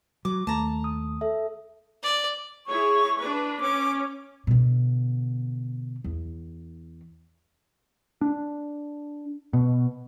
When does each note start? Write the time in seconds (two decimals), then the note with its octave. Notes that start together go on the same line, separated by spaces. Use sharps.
0.25 F#3 D6
0.47 D#2 A3 A5 A#5
0.84 D#6
1.21 A4 E5
2.03 D5
2.67 E4 G#4 C#5 C#6
3.18 D4 B4
3.60 C#4 D6
4.47 B2 D3
6.04 E2
8.21 D4
9.53 B2